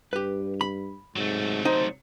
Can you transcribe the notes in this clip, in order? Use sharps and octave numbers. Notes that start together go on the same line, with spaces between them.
G2 G4 B4
B5
G#2 C3 F#3 A3
D#4 C5